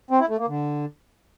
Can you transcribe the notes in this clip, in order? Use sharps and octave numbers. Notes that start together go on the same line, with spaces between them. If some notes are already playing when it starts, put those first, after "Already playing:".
C4
E4
A3
A#3
D3